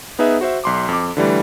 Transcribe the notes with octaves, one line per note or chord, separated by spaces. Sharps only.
B3 D#4 G#4 B4 E5
F#4 C5 E5
B1 C6 D6
F2 D6
D3 E3 G3 A3